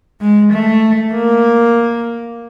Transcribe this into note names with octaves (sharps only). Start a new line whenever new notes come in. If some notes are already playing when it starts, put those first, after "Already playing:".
G#3
A3
A#3